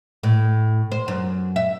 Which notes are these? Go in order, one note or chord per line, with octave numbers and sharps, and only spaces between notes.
A2
C5
F#2
E5